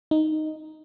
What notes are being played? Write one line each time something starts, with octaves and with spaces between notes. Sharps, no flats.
D#4